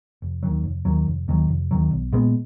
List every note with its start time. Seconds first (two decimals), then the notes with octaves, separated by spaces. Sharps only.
0.22 F1
0.43 D#2 D#3 F#3
0.64 F1
0.85 D#2 D#3 F#3
1.07 F1
1.28 D#2 D#3 F#3
1.49 F1
1.71 D#2 D#3 F#3
1.91 B1
2.12 A#2 G#3 B3